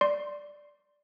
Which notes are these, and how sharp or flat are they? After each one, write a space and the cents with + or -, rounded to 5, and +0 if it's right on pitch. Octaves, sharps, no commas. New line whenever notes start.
D5 +0 C6 +0